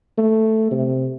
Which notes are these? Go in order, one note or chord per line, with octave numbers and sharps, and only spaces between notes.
A3
C3